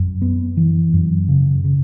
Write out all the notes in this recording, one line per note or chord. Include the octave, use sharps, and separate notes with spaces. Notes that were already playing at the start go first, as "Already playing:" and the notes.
Already playing: F#2
B3
E3
F#2
C#3
C#3